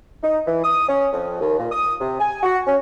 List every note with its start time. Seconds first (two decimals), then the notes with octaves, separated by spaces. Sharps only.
0.23 D#4
0.46 E3
0.64 D#6
0.88 C#4
1.13 F2
1.40 D#2
1.58 A#2
1.71 D#6
2.00 C3
2.20 G#5
2.43 F#4
2.67 C#4